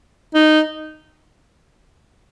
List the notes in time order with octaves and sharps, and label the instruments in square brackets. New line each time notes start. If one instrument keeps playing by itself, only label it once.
[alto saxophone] D#4